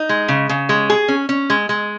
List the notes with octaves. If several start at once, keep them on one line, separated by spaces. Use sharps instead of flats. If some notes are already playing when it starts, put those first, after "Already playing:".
Already playing: D#4
G#3
C#3
C#3
G#3
G#4
C#4
C#4
G#3
G#3